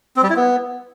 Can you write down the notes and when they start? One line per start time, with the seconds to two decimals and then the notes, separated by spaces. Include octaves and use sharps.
0.16 C4
0.23 G3
0.30 E4
0.36 B3